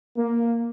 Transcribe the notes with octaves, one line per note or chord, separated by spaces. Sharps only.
A#3